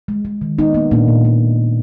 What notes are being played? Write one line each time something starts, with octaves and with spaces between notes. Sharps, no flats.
G#3
G#3
D#3
G#3 B3 D#4
A#3 B3
A#2 A#3 D4
A#2
A#3